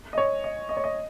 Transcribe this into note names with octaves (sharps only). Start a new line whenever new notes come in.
D#5
C#5
D#5
D#5
C#5
D#5